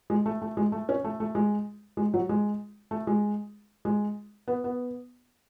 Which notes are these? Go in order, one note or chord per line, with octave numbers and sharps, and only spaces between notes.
G#3
A3
A3
G#3
A3
C#4
A3
A3
G#3
G#3
F#3
G#3
A3
G#3
G#3
B3
B3